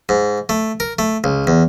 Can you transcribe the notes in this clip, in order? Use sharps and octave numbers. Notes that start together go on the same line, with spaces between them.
G#2
A3
A#4
A3
C#2
E2